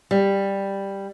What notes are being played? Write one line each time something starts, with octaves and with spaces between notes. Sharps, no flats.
G3